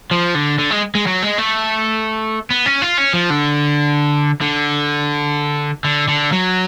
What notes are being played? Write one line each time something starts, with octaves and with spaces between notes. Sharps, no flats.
F3
D3
D3
G#3
G#3
F#3
G#3
A3
B3
C#4
F4
C#4
F3
D3
D3
D3
D3
F#3